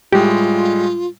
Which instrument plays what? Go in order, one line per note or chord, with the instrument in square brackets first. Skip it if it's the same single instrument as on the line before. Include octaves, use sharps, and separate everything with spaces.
[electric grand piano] A2 G3 G#3 [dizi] F4 [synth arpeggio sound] G4